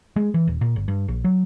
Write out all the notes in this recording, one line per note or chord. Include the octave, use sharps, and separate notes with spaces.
G#3
E3
D#1
A#2
G1
G2
A#1
F#3